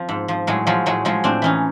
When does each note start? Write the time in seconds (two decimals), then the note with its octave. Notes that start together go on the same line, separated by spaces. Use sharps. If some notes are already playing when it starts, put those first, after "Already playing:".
Already playing: F2 F3
0.09 G#2
0.28 F3
0.47 A2 F#3 G#3
0.67 F3 F#3 G#3
0.86 A2 F#3 G#3
1.05 F3 F#3 G#3
1.24 A2 C4 D4
1.42 E3 C#4 D#4